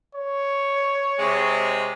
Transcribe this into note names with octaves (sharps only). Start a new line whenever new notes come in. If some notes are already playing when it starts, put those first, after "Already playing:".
C#5
C3 G#3